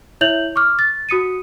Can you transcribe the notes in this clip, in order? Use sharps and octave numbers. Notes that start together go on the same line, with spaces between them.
E4 C#5 E5 G6 F7 F#7
C#6 D6 F6
A6
F#4 D#6 C#7 D#7